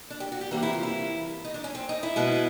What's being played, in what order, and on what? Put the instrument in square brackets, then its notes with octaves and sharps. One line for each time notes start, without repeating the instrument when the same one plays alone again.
[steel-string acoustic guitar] D4
G4
F#4
G4
C3 E3 G3 A#3 F#4
E4
F4
E4
D#4
D4
C#4
C4
D#4
E4
B2 G#3 B3